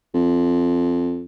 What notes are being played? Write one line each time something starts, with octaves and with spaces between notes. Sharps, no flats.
F2